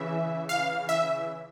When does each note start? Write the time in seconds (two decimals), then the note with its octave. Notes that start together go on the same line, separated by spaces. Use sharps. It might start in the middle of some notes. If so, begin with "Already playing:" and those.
Already playing: C#3 E3 E5
0.49 F5
0.89 E5